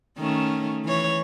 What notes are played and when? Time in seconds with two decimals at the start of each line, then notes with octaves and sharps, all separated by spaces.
0.18 D#3 A3 C#4
0.84 E3 C#5